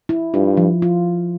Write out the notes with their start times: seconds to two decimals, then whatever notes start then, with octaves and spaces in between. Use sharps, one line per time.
0.09 E4
0.34 G2 F4
0.57 F3
0.82 F4